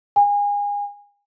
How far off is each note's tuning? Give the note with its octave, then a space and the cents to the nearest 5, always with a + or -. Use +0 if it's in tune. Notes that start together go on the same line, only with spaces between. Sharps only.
G#5 -30